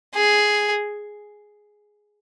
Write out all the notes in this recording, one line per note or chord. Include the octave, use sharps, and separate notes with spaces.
G#4